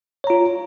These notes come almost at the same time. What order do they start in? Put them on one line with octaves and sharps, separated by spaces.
C#5 A#5 F4